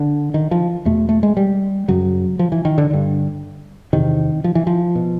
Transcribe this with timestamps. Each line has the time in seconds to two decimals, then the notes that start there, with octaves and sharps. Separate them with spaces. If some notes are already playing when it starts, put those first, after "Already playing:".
Already playing: D3
0.34 D#3
0.51 F3
0.85 E2 B2 A3
1.09 A3
1.23 G#3
1.37 G3
1.88 F#2 C#3 F#3
2.39 F3
2.52 E3
2.65 D#3
2.78 D3
2.91 G2 D3
3.93 E2 C3 D#3
4.44 F3
4.55 E3
4.67 F3
4.95 B2